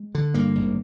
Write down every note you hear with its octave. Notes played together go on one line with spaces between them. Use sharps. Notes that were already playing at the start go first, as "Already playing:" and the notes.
Already playing: G#3
D3
G2 A#3
G#1